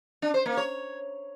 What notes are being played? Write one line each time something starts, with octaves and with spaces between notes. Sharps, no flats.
D4
C5
A#3
C#5